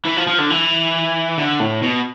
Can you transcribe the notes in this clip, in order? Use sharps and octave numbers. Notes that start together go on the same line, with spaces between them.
E3
F3
F3
D3
E3
D3
A2
B2